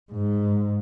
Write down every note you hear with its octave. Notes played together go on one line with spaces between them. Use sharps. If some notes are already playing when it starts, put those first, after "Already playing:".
G#2